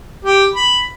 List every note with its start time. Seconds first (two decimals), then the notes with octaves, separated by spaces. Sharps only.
0.25 G4
0.54 B5